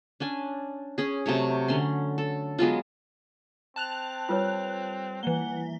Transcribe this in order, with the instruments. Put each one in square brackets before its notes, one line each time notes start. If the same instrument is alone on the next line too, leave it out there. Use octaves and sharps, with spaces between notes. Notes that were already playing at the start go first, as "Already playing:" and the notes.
[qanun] C#4 D4 G#5
C#4 G#4
C3 F#3 A3 C#5
D3 C#4 C6
A4
F#3 G#3 B3 F4
[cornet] C4 [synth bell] A5 F#6 F7
[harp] G3 A4 [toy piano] F4 B4 C#5
[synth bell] E3 G7 [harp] A#3 [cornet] F#5